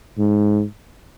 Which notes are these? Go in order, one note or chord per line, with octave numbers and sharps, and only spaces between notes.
G#2